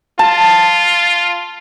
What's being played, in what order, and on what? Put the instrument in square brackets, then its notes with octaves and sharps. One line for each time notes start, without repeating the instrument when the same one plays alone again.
[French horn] F4 [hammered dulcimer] A5